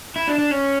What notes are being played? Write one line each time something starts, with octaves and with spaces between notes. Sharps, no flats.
E4
D4
D4
C#4